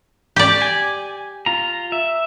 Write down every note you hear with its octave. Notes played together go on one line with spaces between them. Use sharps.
G4 D5
G#5
F4 A#5
E5